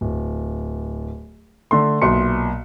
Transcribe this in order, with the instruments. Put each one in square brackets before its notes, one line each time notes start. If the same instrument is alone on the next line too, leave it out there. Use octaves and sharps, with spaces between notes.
[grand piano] D1
D3 A3 C6
B1 A#2 E5 C6 C#7